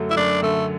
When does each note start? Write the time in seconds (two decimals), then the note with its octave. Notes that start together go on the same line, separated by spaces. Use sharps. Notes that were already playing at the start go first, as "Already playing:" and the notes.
Already playing: F#2 D3 F#3 A3
0.11 E4
0.17 F#2 D4
0.42 D3 A3